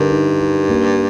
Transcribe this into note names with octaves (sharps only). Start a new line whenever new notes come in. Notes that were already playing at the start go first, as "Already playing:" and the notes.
Already playing: G2 D3 D#4 A#4
D#4
D#4
A#3